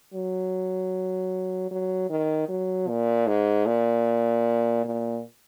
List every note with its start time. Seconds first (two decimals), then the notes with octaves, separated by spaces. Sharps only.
0.14 F#3
1.71 F#3
2.09 D#3
2.49 F#3
2.88 A#2
3.27 G#2
3.66 A#2
4.85 A#2